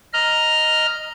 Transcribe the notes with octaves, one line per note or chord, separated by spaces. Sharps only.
D#5 A#5 F6